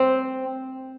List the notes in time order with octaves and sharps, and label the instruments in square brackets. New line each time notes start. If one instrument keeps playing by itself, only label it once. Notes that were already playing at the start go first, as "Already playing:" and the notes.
Already playing: [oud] C4